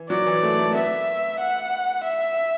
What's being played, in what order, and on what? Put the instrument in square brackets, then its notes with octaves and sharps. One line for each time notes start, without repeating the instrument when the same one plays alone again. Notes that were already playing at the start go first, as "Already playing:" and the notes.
Already playing: [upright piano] E3
[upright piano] F#3 [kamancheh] D5
[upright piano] E3
A3
A3
[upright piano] B3 [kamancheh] E5
[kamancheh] F#5
E5